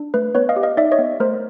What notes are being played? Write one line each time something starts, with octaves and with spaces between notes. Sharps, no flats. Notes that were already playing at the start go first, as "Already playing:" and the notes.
Already playing: D4
A3 B4
B3 B4 C#5
D#5 F5
G4
D#5 F5
D#4 D5 E5
C#5 D#5
B3
A3 A#4 C5